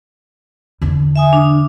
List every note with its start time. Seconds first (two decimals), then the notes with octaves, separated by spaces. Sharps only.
0.82 E2 D3
1.16 E5 G#5 D#6
1.33 D4